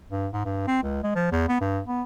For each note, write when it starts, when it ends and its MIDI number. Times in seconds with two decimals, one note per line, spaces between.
0.10 0.28 43
0.33 0.43 44
0.45 0.65 43
0.67 0.81 60
0.83 1.02 37
1.03 1.12 56
1.15 1.31 53
1.32 1.48 40
1.49 1.58 59
1.61 1.81 43
1.86 2.03 59